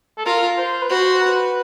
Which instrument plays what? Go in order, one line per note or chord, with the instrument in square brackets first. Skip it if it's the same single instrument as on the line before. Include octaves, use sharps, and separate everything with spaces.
[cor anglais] A4
[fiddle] F4 [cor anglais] A#4
[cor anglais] C5
B4
[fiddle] F#4 [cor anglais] C5
[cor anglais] B4